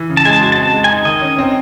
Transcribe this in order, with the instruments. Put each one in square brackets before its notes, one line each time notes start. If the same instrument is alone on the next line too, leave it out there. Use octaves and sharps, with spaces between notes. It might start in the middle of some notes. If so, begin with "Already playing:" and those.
Already playing: [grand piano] E3
C#3
[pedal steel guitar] A5
[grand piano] G#3 [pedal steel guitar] G#5
[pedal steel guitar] A5
[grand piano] F#4
[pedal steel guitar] A5
[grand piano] C4
[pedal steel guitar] A5
[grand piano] G#3
[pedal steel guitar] G#5
[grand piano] D#4
[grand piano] D#3 [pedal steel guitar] D#5
[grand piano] C#4
C4